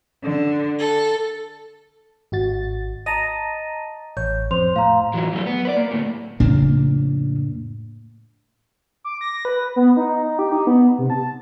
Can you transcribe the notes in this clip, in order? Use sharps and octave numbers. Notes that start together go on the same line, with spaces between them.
D3
A4
G#1 F#4 A6
D#5 A5 A#5 A6 A#6 D#7
A1 C#5 G6
F2 C5 C6 F7
A2 F5 A#5
E3 F#3
F#3 A3
B3
B4 D5
A#3
D2 A2
F2 A2 C#3 A#3 D4
D6
A#6
B4
B3
D#4
D#4
D#4
G4
D#4
B3
C3
A5